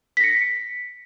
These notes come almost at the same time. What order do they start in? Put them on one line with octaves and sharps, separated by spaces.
B6 A#6 C#7